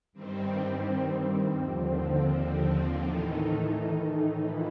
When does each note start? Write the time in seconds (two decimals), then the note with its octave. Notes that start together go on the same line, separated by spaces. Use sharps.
0.13 G2 D#3 G3 C4
1.55 D#2 D3 F3 C4
2.96 A2 D#3 E3 A3 D#4
4.39 E3 F3 E4